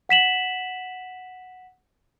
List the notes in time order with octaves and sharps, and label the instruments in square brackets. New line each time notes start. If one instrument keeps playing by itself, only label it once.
[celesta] F#5 B6 E7 F#7